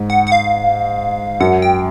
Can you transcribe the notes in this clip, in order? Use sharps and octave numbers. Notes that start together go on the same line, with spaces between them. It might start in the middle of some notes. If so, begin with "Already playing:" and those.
Already playing: G#2
F#5
F#5
F5
F#2 F#5
G5